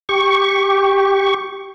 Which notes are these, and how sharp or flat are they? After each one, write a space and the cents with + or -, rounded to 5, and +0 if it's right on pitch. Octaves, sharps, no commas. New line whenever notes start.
G4 +0 C#6 +0